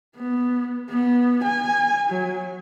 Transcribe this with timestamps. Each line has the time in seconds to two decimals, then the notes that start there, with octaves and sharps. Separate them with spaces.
0.17 B3
0.89 B3
1.44 G#5
2.10 F#3